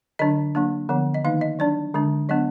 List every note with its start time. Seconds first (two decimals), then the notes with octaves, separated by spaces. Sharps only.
0.19 D3 F#3 D4 D#5
0.55 F#3 A#3 D4
0.89 D3 F3 B3
1.14 D#5
1.24 D#3 A#3 D#4 F5
1.41 D#5
1.59 F#3 D4 D5
1.94 D3 G#3 D4
2.29 F#3 B3 D4 D#5